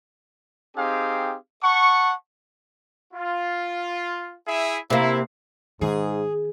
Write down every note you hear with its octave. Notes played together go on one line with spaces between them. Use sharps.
C4 D#4 G4 G#4 F5
F#5 A5 C#6
F4
E4 G#4 E5
C3 A#3 E4
G#2 D#3 G#4